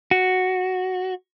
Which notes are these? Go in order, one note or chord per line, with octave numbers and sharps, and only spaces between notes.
F#4